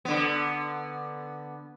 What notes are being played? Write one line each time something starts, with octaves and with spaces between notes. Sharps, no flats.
D3 B3